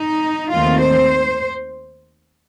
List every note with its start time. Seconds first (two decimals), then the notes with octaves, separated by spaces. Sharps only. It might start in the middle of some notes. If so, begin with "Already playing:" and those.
Already playing: D#4
0.51 D#2 D#3 A3 C4 F4
0.81 C5